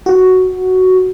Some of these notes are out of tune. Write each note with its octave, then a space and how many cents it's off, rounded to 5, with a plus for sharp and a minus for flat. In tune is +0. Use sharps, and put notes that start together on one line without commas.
F#4 +5